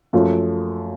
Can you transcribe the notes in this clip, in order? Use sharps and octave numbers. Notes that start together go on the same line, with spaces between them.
F#2 F3 A3